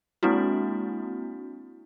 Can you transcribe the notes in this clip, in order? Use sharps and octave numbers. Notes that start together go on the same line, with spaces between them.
G#3 A#3 C4 D4 E4 F#4